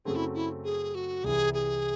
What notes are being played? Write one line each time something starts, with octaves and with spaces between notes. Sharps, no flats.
F#2 C#3 F#3 A3 C4 G#4
E4
E4
G#4
F#4
C2 C3 E3 G#4
G#4